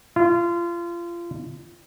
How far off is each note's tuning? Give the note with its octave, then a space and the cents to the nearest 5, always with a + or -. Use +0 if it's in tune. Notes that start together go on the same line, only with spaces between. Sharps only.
F4 -30